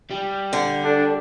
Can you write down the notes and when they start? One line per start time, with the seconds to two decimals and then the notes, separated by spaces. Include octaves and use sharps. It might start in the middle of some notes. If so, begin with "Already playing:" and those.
0.11 G3
0.53 D3
0.85 D4 A4